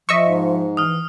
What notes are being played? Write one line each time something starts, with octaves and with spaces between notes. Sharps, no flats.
F3 D#5 E5 C#6
G#2
E3 D#6 F6